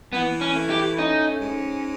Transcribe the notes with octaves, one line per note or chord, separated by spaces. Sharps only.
E3 B3
C#4
A3
G4
C#4 D#4
G#2